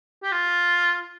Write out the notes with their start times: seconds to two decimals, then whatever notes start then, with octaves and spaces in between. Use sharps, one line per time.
0.23 G4
0.32 F4